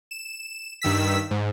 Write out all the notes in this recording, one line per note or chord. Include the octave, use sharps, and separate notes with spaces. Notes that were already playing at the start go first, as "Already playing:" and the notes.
E7
G2 D#3 E6 B6
G#2